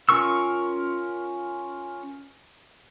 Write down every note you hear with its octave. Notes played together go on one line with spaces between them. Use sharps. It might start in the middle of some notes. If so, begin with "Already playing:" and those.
C#4 F4 A#4 C#6 E6